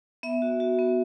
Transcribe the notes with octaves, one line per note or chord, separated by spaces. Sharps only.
B3 E5
F#4
F#4
B3